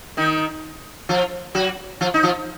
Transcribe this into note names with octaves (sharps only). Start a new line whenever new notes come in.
D#3 D#4
F3 F4
F#3 F#4
F3 F4
D#4
F3 F4